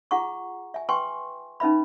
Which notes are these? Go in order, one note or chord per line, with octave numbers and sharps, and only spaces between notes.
F4 G#4 F#5 A#5 C#6
E5 G#5
B4 G5 G#5 C6 C#6
C#4 D#4 B4 E5 B5